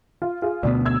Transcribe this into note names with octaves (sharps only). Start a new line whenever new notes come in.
F4
F4 G#4
D2 B2 B3 D4
E6 G#6